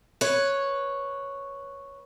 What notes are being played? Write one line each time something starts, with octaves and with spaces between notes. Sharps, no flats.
B4 C#5